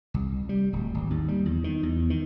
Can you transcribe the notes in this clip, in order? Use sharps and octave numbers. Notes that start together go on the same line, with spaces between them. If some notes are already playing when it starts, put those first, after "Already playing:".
C2
G3
D1
G#1
D#2
G3
E2
D#3
E2
D#3